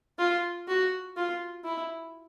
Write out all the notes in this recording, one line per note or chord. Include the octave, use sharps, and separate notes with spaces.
F4
F#4
F4
E4